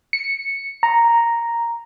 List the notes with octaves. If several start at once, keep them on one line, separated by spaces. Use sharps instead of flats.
C#7
A#5